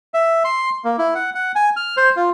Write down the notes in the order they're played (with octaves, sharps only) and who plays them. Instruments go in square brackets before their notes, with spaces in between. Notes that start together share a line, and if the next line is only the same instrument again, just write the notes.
[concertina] E5
C6
A#3
E4
F#5
F#5
G#5
F6
C5
F4